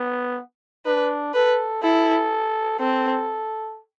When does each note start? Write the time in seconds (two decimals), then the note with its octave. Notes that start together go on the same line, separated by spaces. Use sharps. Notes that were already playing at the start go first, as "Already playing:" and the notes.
Already playing: B3
0.86 D4 B4
1.34 A4 B4
1.82 E4 A4
2.80 C4 A4